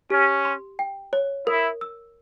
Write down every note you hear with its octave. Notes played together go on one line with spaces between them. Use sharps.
C#4 G4
C6
G5
C#5
E4 A#4
E6